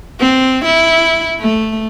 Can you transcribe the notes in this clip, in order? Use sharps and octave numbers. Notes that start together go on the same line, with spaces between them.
C4
E4
A3